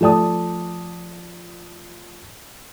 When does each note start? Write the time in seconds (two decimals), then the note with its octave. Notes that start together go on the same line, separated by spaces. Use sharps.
0.01 F3 A3 D5 A5 D#6